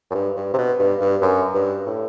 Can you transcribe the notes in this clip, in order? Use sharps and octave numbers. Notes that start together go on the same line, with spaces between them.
F#2
G2
G2
C3
B2
G2
G2
F#2
G2
A2